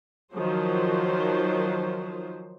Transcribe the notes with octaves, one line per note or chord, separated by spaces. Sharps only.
D#3 F3 F#3 C5